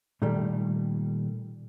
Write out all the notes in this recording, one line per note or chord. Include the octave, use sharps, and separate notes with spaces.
A#2 D#3 G3 A3